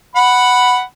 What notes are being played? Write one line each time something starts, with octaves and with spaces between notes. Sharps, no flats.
F#5 B5